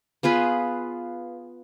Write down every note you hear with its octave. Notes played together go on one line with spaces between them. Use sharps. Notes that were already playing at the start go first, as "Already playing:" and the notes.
B3 F4 G#4 B4